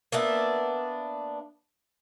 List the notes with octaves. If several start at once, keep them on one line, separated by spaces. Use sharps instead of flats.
A#3 B3 D4 E5